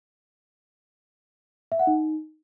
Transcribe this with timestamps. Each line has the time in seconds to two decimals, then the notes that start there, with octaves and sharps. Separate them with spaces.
1.72 E5
1.79 F#5
1.87 D#4